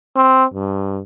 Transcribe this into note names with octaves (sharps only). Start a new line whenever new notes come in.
C4
G2